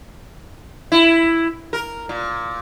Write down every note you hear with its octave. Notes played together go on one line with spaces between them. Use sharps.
E4
A#4
A#2